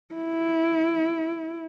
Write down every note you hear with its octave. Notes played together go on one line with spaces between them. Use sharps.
E4